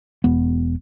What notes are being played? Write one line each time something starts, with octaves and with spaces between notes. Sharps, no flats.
E1 B3